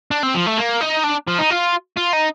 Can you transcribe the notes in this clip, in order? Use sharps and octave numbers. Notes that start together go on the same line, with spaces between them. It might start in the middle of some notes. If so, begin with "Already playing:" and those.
D4
C4
F3
A3
A#3
D#4
D4
F3
D#4
F4
F4
D#4